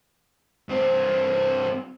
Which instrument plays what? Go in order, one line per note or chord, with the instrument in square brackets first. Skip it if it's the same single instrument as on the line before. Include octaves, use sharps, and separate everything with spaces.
[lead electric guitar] G2 C4